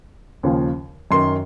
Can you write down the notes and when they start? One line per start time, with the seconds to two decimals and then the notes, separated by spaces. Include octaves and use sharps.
0.43 D#2 C#3 F3
1.11 F#2 D#3 C6